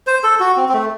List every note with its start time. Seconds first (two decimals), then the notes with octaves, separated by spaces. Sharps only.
0.07 C5
0.24 A4
0.40 F#4
0.57 C4
0.69 C4
0.74 A3